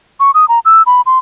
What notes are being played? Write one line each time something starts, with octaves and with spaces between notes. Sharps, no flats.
C#6
D#6
A#5
E6
B5
C6